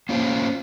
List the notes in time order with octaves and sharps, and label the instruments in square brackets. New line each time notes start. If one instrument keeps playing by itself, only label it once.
[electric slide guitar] A#3 C#4 F4 C5